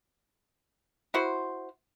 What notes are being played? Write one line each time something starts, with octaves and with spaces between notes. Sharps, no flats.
E4 F#4 C5